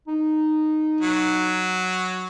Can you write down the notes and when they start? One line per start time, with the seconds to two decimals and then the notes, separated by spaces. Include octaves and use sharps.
0.08 D#4
1.01 F#3